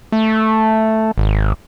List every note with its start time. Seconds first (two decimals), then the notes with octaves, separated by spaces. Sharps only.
0.12 A3
1.18 G#1